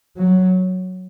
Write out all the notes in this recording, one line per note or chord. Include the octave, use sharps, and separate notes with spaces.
F#3